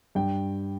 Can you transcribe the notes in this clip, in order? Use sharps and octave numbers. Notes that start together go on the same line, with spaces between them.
G2 G5